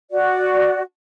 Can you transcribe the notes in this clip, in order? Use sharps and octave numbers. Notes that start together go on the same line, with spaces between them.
F#4 D5